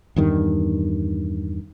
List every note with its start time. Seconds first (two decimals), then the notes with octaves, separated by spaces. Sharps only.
0.16 E2 G2 D#3